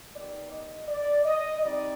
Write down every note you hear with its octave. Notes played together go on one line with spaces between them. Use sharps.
D#3 G3 B3 D5
D#5
D5
D#5
G3 C4 D#4 D5